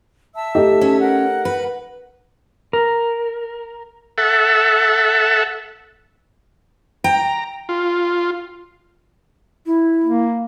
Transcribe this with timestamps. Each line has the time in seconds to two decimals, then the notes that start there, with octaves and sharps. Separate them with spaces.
0.35 E5 A5 E6
0.55 A3 D#4 G4
0.81 C#4
1.01 A#4 F#5
1.45 B4
2.73 A#4
4.18 A4 E5 F#5
7.04 G5 A#5
7.69 F4
9.66 E4
10.04 A#3